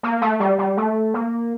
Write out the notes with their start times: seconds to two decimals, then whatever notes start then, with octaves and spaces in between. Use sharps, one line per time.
0.03 A#3
0.22 A3
0.40 G3
0.58 G3
0.77 A3
1.14 A#3